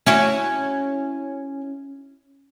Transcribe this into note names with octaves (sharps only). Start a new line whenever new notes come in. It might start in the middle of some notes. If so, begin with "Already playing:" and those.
C#4 E4 F#4